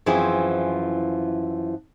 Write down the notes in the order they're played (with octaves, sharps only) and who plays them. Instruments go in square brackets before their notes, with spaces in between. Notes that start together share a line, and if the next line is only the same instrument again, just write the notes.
[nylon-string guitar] F#2 E3 F3 C4 E4 G#4